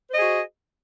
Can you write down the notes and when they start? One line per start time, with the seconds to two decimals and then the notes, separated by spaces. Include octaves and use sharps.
0.09 C5
0.13 D#5
0.18 G#4
0.22 F#4